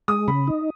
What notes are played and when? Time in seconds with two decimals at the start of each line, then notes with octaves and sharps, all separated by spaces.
0.08 G#3 D#6
0.28 C#3 B5
0.48 D#4